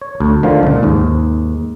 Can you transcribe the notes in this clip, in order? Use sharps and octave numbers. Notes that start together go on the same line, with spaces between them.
C#5
D2
D3 D#3 F3 F4
C#2 A#2
D#2 G#2